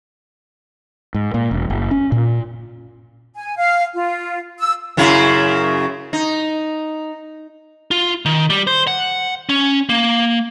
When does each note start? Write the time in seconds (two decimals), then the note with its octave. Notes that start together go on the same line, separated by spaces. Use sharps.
1.14 G#2
1.34 A#2
1.51 E1
1.70 F#1
1.91 C#4
2.12 A#2
3.35 G#5
3.57 F5
3.94 F4
4.59 E6
4.97 F#2 C#3 E4
6.13 D#4
7.91 F4
8.25 D#3
8.50 G3
8.67 C5
8.87 F#5
9.49 C#4
9.89 A#3